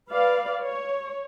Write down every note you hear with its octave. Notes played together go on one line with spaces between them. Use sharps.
B4 D5 F5
C#5